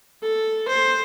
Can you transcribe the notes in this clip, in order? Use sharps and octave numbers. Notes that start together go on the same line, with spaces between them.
A4
C5